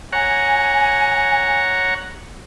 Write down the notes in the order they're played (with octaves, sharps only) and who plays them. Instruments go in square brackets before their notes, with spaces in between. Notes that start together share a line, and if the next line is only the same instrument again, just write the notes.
[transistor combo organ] C#5 F#5 A#5 [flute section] G#5